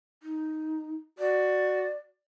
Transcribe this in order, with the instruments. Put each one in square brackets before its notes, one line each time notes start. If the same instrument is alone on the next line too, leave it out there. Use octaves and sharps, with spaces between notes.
[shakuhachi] D#4
[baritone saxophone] F#4 [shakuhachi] D5